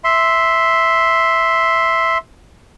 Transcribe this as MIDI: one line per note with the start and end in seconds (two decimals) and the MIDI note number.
0.04 2.18 76
0.04 2.18 84